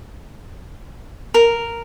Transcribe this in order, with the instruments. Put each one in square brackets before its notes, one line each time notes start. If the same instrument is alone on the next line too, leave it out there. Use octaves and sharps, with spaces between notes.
[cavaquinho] A#4